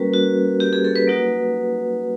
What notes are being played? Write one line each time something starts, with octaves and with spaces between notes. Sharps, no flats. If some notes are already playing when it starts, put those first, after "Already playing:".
Already playing: G3 A#3 C#4 F#4 A#4 B4
F#4
G4
G#4
A4
B4
F#3 A#3 D#4 F#4